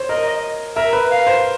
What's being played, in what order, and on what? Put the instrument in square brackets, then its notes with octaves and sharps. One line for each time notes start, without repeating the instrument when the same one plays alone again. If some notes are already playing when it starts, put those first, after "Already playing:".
Already playing: [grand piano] C5 C#5
[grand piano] A#4 [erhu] D#5
[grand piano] A#4 [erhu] E5
[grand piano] B4
[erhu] F5
[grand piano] C5